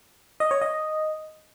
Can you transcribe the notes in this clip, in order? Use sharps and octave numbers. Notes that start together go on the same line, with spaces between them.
D#5
C#5
D#5